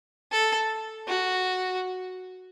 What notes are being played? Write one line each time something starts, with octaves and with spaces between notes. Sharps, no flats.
A4
F#4